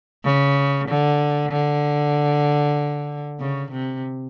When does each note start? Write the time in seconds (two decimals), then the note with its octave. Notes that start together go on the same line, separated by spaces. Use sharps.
0.24 C#3
0.88 D3
1.51 D3
3.40 C#3
3.71 C3